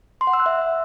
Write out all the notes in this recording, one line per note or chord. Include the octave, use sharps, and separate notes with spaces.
C6
F#5
E6
F#6
E5